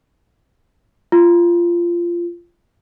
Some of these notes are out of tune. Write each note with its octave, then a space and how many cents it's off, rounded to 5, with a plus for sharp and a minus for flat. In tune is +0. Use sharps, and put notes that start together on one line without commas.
F4 -15